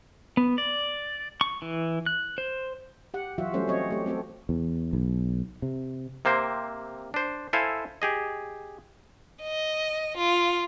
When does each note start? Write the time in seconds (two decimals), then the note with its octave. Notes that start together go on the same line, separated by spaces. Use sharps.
0.37 B3
0.58 D5
1.41 C#6
1.62 E3
2.06 F#6
2.38 C5
3.14 G4 F#5
3.38 E3 F#3 F4 F#4 E5
3.53 F#3 G3 A3 C#4 C5
3.68 F#3 C4 C#5 D#5
3.91 A3 G4
4.06 A3 C4 F#4 A4
4.49 E2
4.93 B1
5.62 C3
6.25 C3 A#3 C4 C5
7.14 D4 C5
7.53 E4 A4 C5 F5 G#5
8.02 G4 G#4 D#5
9.43 D#5
10.17 F4